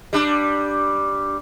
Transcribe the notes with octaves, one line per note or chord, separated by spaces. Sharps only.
G3 D4